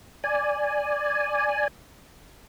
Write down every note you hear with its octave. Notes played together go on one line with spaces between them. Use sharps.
D5 G#5